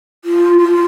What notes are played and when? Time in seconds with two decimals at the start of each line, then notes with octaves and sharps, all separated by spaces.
0.25 F4
0.59 F4